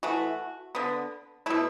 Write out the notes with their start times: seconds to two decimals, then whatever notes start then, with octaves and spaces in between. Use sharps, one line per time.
0.03 E3 A3 F#4
0.75 D3 B3
1.46 B2 A3 E4